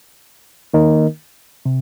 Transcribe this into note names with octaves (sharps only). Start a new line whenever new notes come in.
D#3 A#3 D#4 A#4 D#5
C3